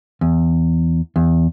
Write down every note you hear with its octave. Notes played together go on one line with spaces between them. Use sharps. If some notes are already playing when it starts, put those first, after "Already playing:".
E2
E2